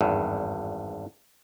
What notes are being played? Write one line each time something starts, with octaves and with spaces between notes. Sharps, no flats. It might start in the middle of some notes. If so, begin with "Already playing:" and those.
G#1 E2 G2